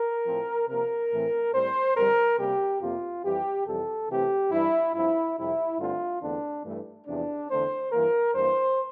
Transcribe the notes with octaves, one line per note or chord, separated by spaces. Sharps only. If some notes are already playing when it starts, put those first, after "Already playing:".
Already playing: A#4
A2 F3 C4
C3 F3 A#3 A#4
A2 E3 A3 C4
A2 G3 C4 C5
F2 D3 G3 A#4
C3 G3 A#3 G4
F2 C3 F3 A#3 F4
F2 E3 G3 G4
F2 C3 E3 G3 A4
C3 E3 A3 C4 G4
G2 E3 G3 E4
G2 F3 C4 E4
F2 C3 G3 E4
G2 D3 A3 C4 F4
E2 D3 A3 C4 D4
G2 E3 A3
E2 C3 F3 D4
E2 D3 A3 C4 C5
G2 E3 A#3 A#4
G2 E3 A#3 C5